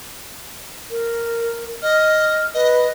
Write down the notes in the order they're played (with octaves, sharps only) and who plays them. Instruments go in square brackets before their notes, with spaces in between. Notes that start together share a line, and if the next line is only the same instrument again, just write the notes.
[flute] A#4
[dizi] D#5 [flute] F6
[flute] B4 [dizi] D#5